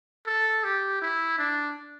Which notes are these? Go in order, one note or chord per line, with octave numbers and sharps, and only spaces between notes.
A4
G4
E4
D4